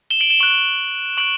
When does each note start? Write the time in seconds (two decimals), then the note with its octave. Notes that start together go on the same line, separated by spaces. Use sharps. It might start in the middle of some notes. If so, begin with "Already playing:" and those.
0.10 E7 G7
0.20 D7 F#7
0.30 E7 G7
0.40 C#6 F#6 D7 F#7
1.17 C#6 F#6 D7 F#7